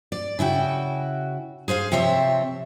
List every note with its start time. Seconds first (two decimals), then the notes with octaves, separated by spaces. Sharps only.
0.12 D5
0.39 C#3 E4 F#4 G5
1.68 G#4 C5 E5 F5
1.92 C3 F3 C4 C#5 E5